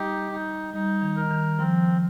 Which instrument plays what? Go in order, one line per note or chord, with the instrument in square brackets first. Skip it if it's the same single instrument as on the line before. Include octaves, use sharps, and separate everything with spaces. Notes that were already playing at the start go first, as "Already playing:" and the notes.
Already playing: [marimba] G3 [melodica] D#4 G4
[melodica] D#4
[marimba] G3 [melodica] D#4
[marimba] D#3
[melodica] A#4
[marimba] D#3
[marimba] F3 [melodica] C4